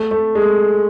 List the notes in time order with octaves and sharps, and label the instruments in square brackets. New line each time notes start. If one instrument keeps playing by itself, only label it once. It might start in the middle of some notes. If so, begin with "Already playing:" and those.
Already playing: [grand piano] A3
A3
G#3